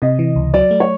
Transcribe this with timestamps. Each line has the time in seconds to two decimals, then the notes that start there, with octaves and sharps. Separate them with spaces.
0.02 C3 D#5
0.19 E3
0.36 C#2
0.54 F#3 D5
0.71 A3
0.80 C#5